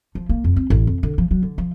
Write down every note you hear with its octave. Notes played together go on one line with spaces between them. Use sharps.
F3
A#3
F2
C4
A1
F2
D3
F3
F#3
D3
F3